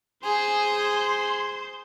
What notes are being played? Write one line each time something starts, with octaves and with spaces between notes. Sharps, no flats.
G#4 C5 C6